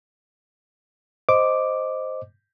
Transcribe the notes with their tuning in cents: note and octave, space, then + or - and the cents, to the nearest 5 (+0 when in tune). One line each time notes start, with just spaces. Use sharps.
C5 +0 D#5 +0 D6 +0